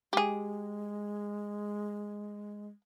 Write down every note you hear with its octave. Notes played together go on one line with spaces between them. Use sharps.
G#3 G4 G#4